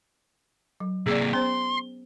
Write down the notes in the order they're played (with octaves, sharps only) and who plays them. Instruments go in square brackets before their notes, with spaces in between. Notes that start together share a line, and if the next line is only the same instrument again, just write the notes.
[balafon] F#3
[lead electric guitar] C3 A#3 [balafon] G#4 D5
[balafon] B3 C#4 C5 [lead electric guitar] C6